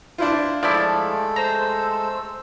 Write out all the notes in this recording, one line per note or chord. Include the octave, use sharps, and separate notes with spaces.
D4 E4 F4 C5
F3 G#3 A3 E4 A4 D5
C5 A#5 E6